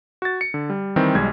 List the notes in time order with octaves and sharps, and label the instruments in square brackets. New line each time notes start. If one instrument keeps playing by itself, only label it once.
[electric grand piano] F#4 A6
C#7
D3
G3
D#3 E3 G3 C4
B1 G3 G#3 G#6